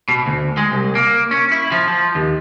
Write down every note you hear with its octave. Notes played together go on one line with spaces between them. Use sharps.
B2
D2
G#3
C2
A#3
C#4
E4
F3
F3
D#2